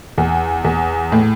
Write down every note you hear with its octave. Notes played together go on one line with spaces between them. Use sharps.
E2
E2
A2